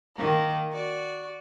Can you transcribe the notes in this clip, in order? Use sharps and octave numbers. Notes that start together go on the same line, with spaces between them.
D#3 A#3
F#4 D5